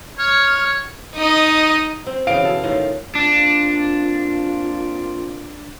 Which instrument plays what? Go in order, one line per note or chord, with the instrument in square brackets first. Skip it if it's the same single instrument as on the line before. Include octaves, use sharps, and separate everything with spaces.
[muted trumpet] C#5 [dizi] F6
[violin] D#4 D#5
[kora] C4
[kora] C#3 E3 [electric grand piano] F5 D7
[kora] B2 A4
A2 D#3 F4
[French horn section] A#3 C4 F4 [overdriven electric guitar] D4